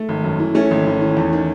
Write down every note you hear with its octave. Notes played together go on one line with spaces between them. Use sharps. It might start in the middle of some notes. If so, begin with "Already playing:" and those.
Already playing: A3
G#1
F#2
E3
E3 A3 C#4
G#1
G#1
E3
E2
D#3